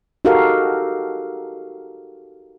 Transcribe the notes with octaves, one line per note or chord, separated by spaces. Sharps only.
D#4 F#4 G4 A4 A#4 F5